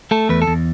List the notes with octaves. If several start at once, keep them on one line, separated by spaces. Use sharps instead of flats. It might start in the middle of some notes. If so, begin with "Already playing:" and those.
A3 A4
E2 B4
A4
E2